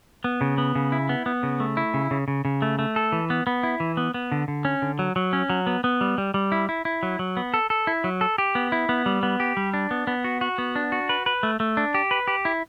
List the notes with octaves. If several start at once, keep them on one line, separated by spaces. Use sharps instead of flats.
B3
C#3
B3
C#3
E4
B3
B3
C#3
A3
E4
C#3
C#3
C#3
C#3
A3
A3
A4
E3
B3
B3
E4
E3
B3
B3
D3
D3
C#4
D3
F#3
F#3
C#4
F#3
B3
B3
G3
G3
G3
E4
E4
E4
F#3
F#3
B3
A4
A4
E4
F#3
A4
G4
B3
E4
B3
G3
B3
G4
G3
D4
B3
B3
F#4
F#4
B3
D4
F#4
B4
B4
A3
A3
D4
G4
B4
G4
E4